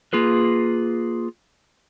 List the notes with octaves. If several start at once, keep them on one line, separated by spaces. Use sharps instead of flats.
A#3 F4 G#4 B4